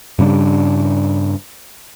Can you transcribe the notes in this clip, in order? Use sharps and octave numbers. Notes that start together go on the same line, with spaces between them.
G2 C#3 G3 D4